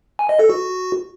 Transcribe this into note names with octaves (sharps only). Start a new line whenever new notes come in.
G#5
D#5
A4
F#4